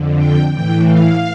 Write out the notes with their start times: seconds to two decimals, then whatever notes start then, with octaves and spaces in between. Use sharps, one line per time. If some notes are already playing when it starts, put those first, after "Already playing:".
Already playing: F2 D3
0.16 G5
0.50 A2 E3 G5
0.86 F5